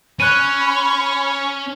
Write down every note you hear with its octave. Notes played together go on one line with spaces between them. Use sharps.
C#4 C#5 B5 F#6 D#7